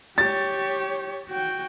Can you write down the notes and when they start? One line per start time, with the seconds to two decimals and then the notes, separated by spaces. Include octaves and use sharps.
0.18 G4 C#5 A6
1.29 F#4 G5